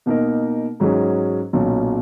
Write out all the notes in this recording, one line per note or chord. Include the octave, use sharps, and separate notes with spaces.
B2 A#3 D#4 A#4
G#2 F#3 C#4 G#4
B1 A#2 F#3 C#4